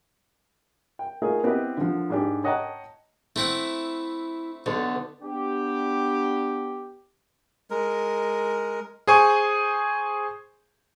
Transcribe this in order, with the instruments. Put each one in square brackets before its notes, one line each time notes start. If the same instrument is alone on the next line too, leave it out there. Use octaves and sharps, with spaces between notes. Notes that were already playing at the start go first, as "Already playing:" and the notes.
[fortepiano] G5
A3 D#4 F4 G#4 A#4
B3 C4 E4 G4 B4 D#5
D3 F3
G#2 D4 G4
C#5 D#5 F#5 G5 A5 A#5
[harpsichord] A3 C4 F#5 [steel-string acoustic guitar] E4
[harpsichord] B1 [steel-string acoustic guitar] D3 B3 A4
[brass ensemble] B3 D4 G4
[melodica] G#3 A#4
[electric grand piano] G#4 C5 G#5 C#6